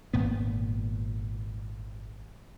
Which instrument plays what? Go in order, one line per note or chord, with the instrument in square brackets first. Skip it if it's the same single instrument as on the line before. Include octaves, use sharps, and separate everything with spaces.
[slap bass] G#1 A#2 B3